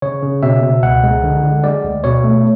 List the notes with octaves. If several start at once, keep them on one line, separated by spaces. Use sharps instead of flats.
C#3 C#5
C#3
B2 E5
B2
C#2 F#5
G#3
D3
D3
G#3 D5
D2
B2 C#5
A3